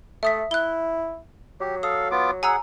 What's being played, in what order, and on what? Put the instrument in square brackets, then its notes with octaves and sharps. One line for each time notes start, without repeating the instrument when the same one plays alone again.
[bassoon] A3 [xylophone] E5 D#6 B6
[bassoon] E4 [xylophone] F#6 G7
[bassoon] F#3 [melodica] G4
[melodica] A4 F5 [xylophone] D#6
[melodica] B3 F4 D6
[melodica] G#4 F#5 [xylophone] G#5 A#5 E6